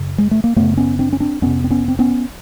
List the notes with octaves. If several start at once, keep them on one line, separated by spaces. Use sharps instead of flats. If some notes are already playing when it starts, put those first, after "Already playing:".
Already playing: F#2 C#3
G#3
A3
A#3
F#2 C#3 A3 B3
B3 C#4
C4 D4
C#4
C4 D4
F2 C3 B3 C#4
C4
B3 C#4
C4
B3 C#4